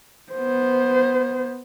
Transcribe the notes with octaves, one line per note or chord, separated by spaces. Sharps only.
B3 C5